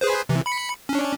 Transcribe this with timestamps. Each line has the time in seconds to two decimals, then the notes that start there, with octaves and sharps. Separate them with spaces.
0.01 G#4 B4 C5
0.29 C3 E3
0.46 B5 C#7
0.89 C#4 D4